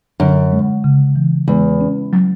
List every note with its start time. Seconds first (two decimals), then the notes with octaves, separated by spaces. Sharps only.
0.20 F#2 D3
0.52 G#3
0.84 C#3
1.16 E3
1.48 E2 G#3
1.81 C#4
2.13 F#3